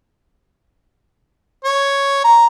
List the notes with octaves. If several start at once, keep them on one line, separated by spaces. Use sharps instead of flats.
C#5
A#5